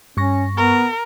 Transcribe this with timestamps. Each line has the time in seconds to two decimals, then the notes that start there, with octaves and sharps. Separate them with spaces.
0.17 G2 C#4 C#6 A#6
0.57 B3 A#4